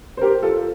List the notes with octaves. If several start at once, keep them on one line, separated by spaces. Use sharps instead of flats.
C5
G4 A#4
F4 A4